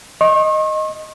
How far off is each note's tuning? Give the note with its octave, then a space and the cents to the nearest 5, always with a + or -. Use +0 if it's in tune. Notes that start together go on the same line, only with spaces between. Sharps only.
D#5 +0 C#6 -45